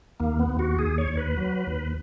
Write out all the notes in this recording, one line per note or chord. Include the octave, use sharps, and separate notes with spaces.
D#2 A#3
B3
D#2
F#4
D#2 G#4
C#5
D#2
B4
F#3
D#2